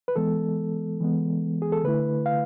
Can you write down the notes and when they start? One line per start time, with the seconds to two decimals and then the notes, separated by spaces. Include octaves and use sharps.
0.08 B4
0.16 E3 G#3 B3 A4
1.00 E3 G#3 B3
1.62 G#4
1.72 A4
1.84 D3 A3 E4 B4
2.26 F5